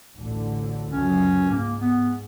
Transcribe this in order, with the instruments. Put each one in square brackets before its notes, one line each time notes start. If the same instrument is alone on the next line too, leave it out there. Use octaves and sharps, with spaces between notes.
[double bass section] A1 D2 D3
[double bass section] C#2 F#2 [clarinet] C#4
[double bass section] G#2 [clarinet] A#3
[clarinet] B3